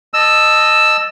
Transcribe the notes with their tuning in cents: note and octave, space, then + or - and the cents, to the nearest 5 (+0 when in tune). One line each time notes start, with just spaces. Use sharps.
D#5 -15 A5 +0 E6 +5